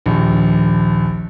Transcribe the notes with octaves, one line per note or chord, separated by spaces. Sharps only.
A#1 D#2